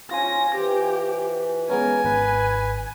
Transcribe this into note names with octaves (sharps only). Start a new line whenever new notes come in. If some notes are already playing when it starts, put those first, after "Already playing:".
C#4 F4 C5 G#5 A#6
E3 G4
G#3 B3 C#4 A#4 G#5
G#1 B4